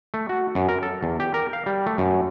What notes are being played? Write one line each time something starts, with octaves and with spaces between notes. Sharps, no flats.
A3
F#4
F#2
A#4
A4
E2
G4
A#4
F5
G3
A3
F#2